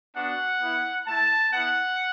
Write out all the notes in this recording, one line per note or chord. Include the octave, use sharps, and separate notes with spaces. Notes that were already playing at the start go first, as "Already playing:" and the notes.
B3 D4 F#4 F#5
B3 E4
A3 E4 A5
B3 E4 F#5